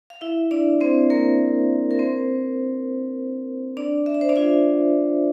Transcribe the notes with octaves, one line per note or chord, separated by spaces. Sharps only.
F5
E4 E5
D4 D5
C4 C5
A#3 A#4
A#4
C4 C5
D4 D5
E5
D5
C5
D4 D5
F4 F5